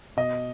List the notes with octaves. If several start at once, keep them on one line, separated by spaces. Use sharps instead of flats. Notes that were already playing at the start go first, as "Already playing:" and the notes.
B2 D#5